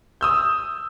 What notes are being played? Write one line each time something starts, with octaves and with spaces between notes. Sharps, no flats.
D#6 E6 G6